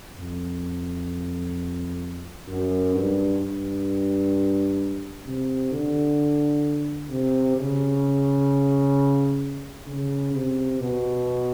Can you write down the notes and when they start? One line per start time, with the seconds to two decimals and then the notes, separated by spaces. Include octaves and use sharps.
0.17 F2
2.48 F#2
2.94 G2
3.41 G2
5.26 C3
5.71 D3
7.10 C3
7.56 C#3
9.87 C#3
10.34 C3
10.80 B2